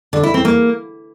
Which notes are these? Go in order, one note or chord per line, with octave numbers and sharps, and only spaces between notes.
D3
E4
C4
A#3